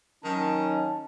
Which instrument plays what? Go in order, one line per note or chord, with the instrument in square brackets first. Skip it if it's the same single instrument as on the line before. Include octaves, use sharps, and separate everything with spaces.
[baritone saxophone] D#3 [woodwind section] F#3 C#4 [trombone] D#4 [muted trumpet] A5